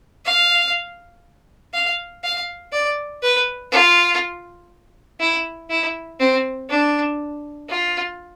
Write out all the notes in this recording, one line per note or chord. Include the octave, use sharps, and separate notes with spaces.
F5
F5
F5
D5
B4
F4
E4
E4
C4
D4
F4